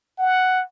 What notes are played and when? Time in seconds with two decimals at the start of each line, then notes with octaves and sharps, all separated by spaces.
0.18 F#5